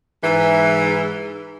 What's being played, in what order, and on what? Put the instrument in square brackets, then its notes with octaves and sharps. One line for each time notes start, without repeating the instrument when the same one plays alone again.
[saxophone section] G#2 E3